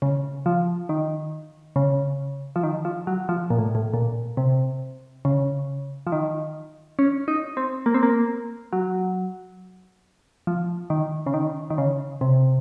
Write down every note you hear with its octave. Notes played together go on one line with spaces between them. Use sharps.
C#3
F3
D#3
C#3
F3
D#3
F3
F#3
F3
A#2
A2
A2
A#2
C3
C#3
F3
D#3
C#4
D#4
C4
A#3
C4
A#3
F#3
F3
D#3
C#3
D#3
D#3
C#3
C3